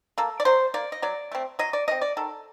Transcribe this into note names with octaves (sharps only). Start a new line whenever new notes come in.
A#3 A4
D5
F#3 C5
A#3 D5
D#5
F#3 D5
A3 C4
F#3 D#5
D5
A3 C4 D#5
D5
D#3 A4